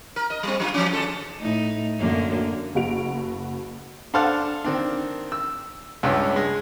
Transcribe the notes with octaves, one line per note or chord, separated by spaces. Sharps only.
A#4
D#5
G3 G#3 C4
F#3 D#4 F4
F3 G3 C#4
D#2 G#3 A4
A2 A3 D#4
F#2 D3 A#3
F#1 F#4 D7 F7
D4 A4 C5 F5 F#5 A5
D#3 C4 D4
E6
C#2 G2 C#4 E6
G#3